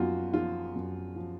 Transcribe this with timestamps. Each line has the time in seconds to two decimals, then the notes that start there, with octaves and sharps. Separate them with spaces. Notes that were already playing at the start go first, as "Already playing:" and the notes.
Already playing: F#2 F3 F4 F#4
0.33 F3 F4
0.75 F#2
1.16 F3